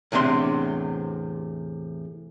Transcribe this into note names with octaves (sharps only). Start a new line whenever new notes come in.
E2 A2 C3 D4 C6